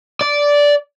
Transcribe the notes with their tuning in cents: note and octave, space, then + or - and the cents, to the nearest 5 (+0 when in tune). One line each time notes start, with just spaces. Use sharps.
D5 -10